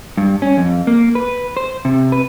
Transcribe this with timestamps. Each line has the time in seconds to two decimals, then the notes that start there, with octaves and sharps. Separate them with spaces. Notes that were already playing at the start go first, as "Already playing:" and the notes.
0.18 G2
0.42 C#4
0.57 F2
0.87 A#3
1.15 B4
1.57 C5
1.85 C3
2.12 B4